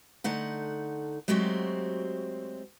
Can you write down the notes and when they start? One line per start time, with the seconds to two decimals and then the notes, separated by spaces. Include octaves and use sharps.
0.24 D3 A3 D#4 F#5
1.28 F#3 G#3 A3 C4 F#4 G4